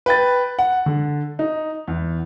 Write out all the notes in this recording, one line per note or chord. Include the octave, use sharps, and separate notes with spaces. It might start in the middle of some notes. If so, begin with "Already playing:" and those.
B4 G5 A6
F#5
D3
D#4
E2